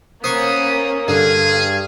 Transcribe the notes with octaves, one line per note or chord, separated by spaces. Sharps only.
A#3 B3 C#4 C5 C#6 D#6
G2 D3 G#4 F5